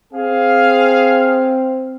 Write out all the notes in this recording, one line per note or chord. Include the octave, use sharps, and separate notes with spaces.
C4 G#4 F5